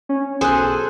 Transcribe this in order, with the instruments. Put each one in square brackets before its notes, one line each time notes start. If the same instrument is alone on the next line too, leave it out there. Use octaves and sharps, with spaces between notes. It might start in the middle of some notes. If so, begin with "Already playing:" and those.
[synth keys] C#4
[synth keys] B1 F#6 [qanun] G#4 A4 C5